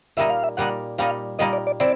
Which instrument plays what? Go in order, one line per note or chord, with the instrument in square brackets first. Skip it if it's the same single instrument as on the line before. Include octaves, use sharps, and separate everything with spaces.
[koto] A#2 G3 A#3 D#4 [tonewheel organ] E5
[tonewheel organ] F5
E5
[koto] A#2 G3 A#3 D#4 [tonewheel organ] F#5
[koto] A#2 G3 A#3 D#4 [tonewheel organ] F5
[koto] A#2 G3 A#3 D#4 [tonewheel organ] D#5
[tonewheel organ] D5
D5
[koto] C4 E4 [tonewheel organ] D5